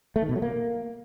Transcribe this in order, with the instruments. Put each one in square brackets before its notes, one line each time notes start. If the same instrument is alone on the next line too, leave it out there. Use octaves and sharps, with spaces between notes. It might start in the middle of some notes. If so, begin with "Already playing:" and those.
[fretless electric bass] A3
D#3
B2
F#3
A#3